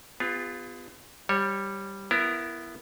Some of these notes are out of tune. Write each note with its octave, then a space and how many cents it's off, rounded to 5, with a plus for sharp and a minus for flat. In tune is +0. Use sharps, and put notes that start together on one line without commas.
B3 +30 F4 +0 G#4 -40
G3 +0 C#5 -25
B3 +0 E4 +25 A#4 +0